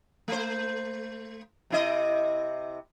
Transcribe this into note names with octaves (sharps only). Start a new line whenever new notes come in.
A3 C5
C3 E4 D#5